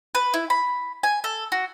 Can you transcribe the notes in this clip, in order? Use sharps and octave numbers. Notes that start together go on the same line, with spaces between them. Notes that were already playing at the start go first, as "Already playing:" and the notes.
B4
E4
B5
G#5
A4
F#4